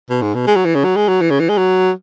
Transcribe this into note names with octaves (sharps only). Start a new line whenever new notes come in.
B2
G#2
B2
G#3
F#3
E3
C#3
F#3
G#3
F#3
E3
C#3
E3
G#3
F#3